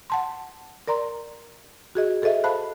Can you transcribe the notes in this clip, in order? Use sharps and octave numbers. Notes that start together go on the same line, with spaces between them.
F#5 A5 C6
A#4 D5 A#5 C6
F#4 G#4 D#5
G#4 A4 C5 D#5 E5
C5 F5 A5 B5 F#6